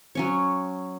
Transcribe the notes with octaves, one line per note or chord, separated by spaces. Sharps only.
F#3 C#4 C#5